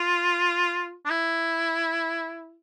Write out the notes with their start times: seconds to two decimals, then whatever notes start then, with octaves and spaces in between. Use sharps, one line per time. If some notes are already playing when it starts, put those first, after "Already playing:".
Already playing: F4
1.05 D4
1.10 E4